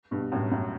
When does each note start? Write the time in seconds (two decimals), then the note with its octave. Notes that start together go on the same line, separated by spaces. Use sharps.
0.11 G2 B2
0.32 F#2 A2
0.51 F#2 A2